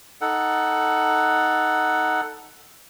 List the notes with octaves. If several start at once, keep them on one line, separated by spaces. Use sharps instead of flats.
D#4 A4 F#5